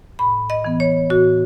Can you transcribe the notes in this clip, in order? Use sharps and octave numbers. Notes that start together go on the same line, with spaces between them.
A2 B5
D#5
E3 B3
C#5
A2 F#4